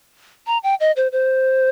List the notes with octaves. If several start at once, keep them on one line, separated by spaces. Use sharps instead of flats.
A#5
G5
D#5
C5
C5